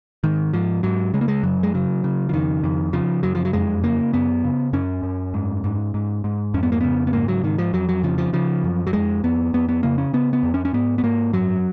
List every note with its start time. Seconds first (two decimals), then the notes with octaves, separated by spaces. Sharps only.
0.24 G#2 D#3
0.53 G#2 F3
0.83 G#2 F#3
1.14 C#3 G#3
1.21 A#3
1.28 G#3
1.43 F#2 F#3
1.63 G#3
1.74 C#3 F#3
2.04 C#3
2.29 F3
2.33 F2 D#3
2.64 F2
2.93 C#3 F3
3.23 F#2 F#3
3.35 F3
3.45 F#3
3.53 F2 G#3
3.83 C#3 A#3
4.13 F#2 B3
4.44 C#3
4.73 F#2 C#4
5.03 F#2
5.34 G#2
5.64 G#2
5.94 G#2
6.24 G#2
6.54 F2 C#4
6.63 B3
6.72 A#3
6.81 C#3 B3
7.07 B3
7.13 G#2 A#3
7.28 F#3
7.43 G#2 D#3
7.58 F3
7.73 F2 F#3
7.89 F#3
8.03 C#3 F3
8.18 F3
8.33 C#3 F3
8.64 F#2
8.87 F#3
8.93 F2 G#3
9.23 F2 B3
9.53 F2 B3
9.69 B3
9.83 C#3 A#3
9.98 C#4
10.13 C#3 B3
10.33 B3
10.43 F2
10.54 C#4
10.65 C#4
10.73 G#2 B3
10.98 B3
11.03 G#2 A#3
11.33 F#2 F#3